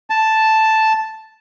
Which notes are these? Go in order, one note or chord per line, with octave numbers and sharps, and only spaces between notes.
A5